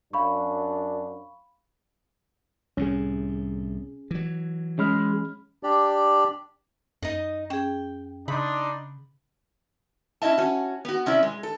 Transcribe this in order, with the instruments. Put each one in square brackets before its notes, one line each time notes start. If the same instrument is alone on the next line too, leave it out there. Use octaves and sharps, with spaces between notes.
[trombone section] F#2 D4 [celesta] F5 B5 C#6
[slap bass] C2 A2 [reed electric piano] C#4 G#4
[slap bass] E3 F#3
[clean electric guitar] G#3 [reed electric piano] C#4 B5 F6
[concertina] D4 G4 D5
[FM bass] F#2 [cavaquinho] D#4 D#5
[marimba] C#4 G#4 [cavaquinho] G5
[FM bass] C#3 [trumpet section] D4 D#4 C6 [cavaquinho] B5
[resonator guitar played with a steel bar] C#4 E4 D#5 E5 A5
C#4 F#4
B3 F#4
C3 C#4 E4 D5 E5
G#3
A4